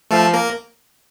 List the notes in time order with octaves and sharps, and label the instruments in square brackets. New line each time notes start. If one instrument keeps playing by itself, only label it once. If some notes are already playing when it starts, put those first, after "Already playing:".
[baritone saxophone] F3 [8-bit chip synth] A3 A4
[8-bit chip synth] A#3 A#4